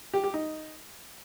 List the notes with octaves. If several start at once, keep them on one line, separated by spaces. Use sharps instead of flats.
G4
G4
D#4